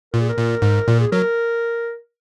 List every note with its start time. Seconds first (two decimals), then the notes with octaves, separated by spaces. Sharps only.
0.13 A#2 A#4
0.20 G#4
0.29 A#4
0.38 A#2
0.62 G#2
0.88 A#2
1.00 G#4
1.12 F#3 A#4